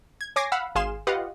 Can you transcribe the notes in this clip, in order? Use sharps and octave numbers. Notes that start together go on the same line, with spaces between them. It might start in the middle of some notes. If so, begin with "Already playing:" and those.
G#6
C#5 G#5 D6 G#6 A#6 C7
F5 F#5 B5 E6
G#1 G#4 F5 G#5 C6 E7
F4 G4 B4 D#5 F5 F#5